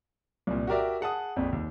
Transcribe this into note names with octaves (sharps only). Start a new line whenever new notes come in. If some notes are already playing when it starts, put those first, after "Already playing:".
C2 A#2
F#4 G4 A#4 D5 E5
G#4 F#5 A5 D#6
A#1 F2
D#2